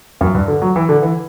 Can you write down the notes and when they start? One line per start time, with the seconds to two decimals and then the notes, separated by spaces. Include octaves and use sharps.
0.21 F#2
0.35 G2
0.48 D3
0.62 F#3
0.76 E3
0.89 D3
1.02 E3